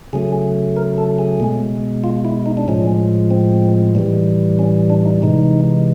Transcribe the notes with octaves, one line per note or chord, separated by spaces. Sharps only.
C#3 F#3 A3 G#4
A#4
A4
G#4
B2 G#3
F4
E4
D#4
D4
A2 F3 G#3 C#4
C4
A2 E3 G3
C#4
D4
D#4
C3 E3 G#3 D#4